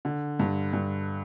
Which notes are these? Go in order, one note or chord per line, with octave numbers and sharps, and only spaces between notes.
D3
G2
G2